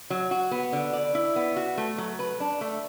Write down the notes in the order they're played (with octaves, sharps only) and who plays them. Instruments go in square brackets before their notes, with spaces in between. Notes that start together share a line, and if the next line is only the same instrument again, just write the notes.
[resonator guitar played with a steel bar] F#3
F#4
B3
D3
D5
E4
B3
F#4
A3
F#3
B4
D4
A3